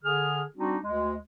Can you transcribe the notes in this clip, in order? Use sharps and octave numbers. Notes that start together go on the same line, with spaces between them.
D3 G#4 F6
G3 C4 D4 D#4 F#4
D2 G#3